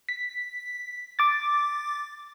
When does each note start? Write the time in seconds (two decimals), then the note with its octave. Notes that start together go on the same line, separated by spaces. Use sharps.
0.09 B6
1.19 D6 A6